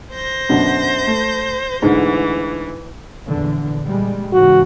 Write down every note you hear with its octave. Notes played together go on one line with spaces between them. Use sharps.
C5 G6 A#6
F#2 B2 D3
A3
D2 G#2 E3
A#1 E2 D3
A#2 G3 G#3
G#2 C#3 E3 F#4